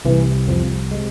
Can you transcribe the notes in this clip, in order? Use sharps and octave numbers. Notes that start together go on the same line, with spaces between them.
C2 C3 E3
F2 F3
C3 G#3